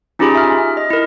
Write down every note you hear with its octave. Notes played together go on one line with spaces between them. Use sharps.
C#4 D#4 F4 G4 G#4 B5
E5 F6
D#5
E4 A#4